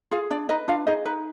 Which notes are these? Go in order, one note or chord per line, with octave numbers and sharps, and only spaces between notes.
F4 G#4 F5
D4 D5
D#4 B4 D#5
D4 F4 F5
D#4 G#4 D#5
D#4 B4